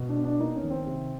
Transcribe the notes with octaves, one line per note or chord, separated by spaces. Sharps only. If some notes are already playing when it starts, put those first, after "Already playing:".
Already playing: B2
D4
B3
D4
A#3 D#4
C#4
D#3
C4
C3